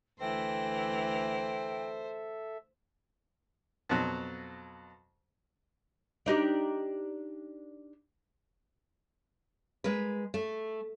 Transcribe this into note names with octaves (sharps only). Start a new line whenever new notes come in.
D2 E3 A4 C5 E5 G5 A#6
F2 B2 F#3
D4 D#4 G4
G#3 A#4 B4
A3